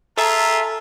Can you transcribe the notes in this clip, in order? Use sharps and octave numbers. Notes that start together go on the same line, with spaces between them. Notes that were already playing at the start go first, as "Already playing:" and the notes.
F4 G#4 A4 E5 A#5